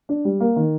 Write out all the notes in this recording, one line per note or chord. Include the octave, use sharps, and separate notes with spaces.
D4
G3
A#3
D#3